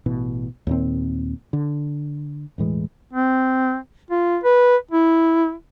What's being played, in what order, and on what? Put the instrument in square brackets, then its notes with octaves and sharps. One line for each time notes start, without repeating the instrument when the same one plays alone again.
[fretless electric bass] A1 B2 E3
D#2 A#2 C4
D3
E1 A2 E3 G#3
[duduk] C4
F4
B4
E4